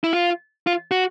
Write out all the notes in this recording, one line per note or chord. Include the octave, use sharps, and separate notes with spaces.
E4
F4
F4
F#4